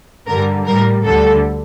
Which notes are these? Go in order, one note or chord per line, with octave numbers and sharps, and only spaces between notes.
G2 D3 G3 A#4
A2 G3 A#4
D2 D3 G3 A4